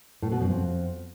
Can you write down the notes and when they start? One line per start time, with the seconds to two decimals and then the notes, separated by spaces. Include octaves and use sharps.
0.22 A2
0.32 B2
0.41 F#2
0.50 F2